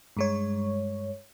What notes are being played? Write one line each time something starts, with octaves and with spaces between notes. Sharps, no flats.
G2 G#3 C#5